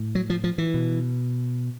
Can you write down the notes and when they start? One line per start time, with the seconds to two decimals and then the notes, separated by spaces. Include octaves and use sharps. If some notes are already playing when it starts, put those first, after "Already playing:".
Already playing: A2
0.15 F#3
0.30 F3
0.44 F3
0.58 E3
0.74 B2